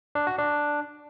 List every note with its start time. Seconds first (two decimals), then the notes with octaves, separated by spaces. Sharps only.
0.15 D4
0.27 F#4
0.39 D4